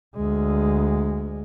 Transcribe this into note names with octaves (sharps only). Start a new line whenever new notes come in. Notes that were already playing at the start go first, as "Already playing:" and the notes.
D2 G#3